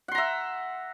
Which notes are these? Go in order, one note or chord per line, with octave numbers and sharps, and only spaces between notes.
E5 F#5 A#5 C6